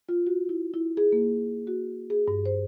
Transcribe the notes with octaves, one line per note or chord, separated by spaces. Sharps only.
F4
F#4
E4
E4
G#4
A#3
F#4
G#4
G2
C5